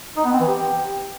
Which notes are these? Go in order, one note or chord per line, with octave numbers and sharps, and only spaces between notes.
D#4
B3
C4
E3
G4